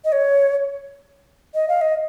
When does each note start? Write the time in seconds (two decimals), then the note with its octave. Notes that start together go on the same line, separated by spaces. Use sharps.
0.05 D#5
0.12 C#5
1.54 D#5
1.69 F5
1.81 D#5